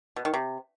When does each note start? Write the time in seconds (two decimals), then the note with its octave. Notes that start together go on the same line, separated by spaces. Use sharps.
0.16 B2
0.25 D#3
0.34 C3